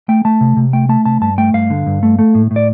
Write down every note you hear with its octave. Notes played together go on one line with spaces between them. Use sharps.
A3 G5
A3 A5
C3
C3
A3 G5
A3 A5
C3 A5
G2 A5
A3 G5
G2 F5
D3
G2
A3
A3
A2
A2
D5